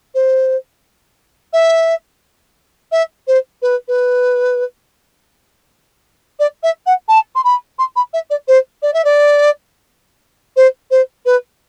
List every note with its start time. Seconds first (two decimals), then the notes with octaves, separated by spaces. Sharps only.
0.15 C5
1.53 E5
2.92 E5
3.27 C5
3.62 B4
3.88 B4
6.39 D5
6.63 E5
6.86 F#5
7.08 A5
7.35 C6
7.44 B5
7.79 C6
7.96 B5
8.13 E5
8.30 D5
8.48 C5
8.82 D5
8.94 E5
9.05 D5
10.56 C5
10.91 C5
11.26 B4